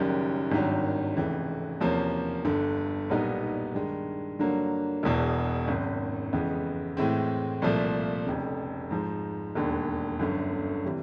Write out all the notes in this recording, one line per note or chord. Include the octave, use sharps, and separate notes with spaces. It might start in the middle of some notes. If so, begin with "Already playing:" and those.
Already playing: F#1 F#2 D#3 G3
G#1 G2 D#3 F#3
F1 F2 C#3 E3 G#3
E2 C3 F3 A#3 C#4
G1 G2 D3
B1 A#2 G3 B3 D#4
G2 D#3 G#3
G2 D3 F#3 A#3
E1 E2 B2
G#1 F#2 D#3
F2 C#3 E3 G#3 B3
A2 E3 G#3 C4
C2 A#2 F3 A3
F1 F2 C#3
G#2 F3 G#3
E1 D#2 D3
G1 F#2 D3
C3 E3 G3